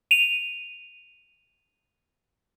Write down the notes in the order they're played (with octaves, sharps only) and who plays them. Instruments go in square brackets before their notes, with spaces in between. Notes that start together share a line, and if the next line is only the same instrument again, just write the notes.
[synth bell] D#7 F7